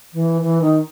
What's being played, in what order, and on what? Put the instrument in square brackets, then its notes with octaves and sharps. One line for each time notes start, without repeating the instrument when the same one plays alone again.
[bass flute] E3
E3
D#3